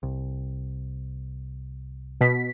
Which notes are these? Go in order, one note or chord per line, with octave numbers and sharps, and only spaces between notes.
C2
B2 B6